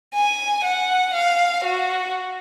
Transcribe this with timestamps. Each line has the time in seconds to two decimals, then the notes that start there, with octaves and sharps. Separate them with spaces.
0.15 G#5
0.65 F#5
1.14 F5
1.64 F#4